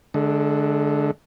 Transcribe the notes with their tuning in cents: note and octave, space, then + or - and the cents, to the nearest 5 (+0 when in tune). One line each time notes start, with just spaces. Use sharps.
D3 +0 G#3 +35